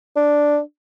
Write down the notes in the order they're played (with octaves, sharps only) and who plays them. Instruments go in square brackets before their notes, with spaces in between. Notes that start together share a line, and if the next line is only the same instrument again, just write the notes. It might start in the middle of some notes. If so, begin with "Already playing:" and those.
[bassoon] D4